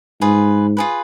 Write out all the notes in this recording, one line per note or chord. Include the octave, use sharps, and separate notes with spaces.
G#2 F4 G#4 B4
F4 G#4 B4